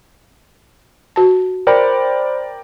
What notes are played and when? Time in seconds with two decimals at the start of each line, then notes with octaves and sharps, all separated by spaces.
1.16 F#4 A5
1.67 A#4 C5 D5 G5 B5